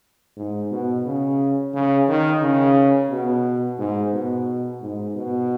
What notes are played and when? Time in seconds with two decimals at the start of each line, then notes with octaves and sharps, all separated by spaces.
0.37 G#2
0.71 B2
1.06 C#3
1.74 C#3
2.08 D#3
2.42 C#3
3.10 B2
3.79 G#2
4.13 B2
4.81 G#2
5.15 B2